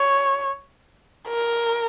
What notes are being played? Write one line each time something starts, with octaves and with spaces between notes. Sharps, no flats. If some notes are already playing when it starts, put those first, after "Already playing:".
Already playing: C#5
A#4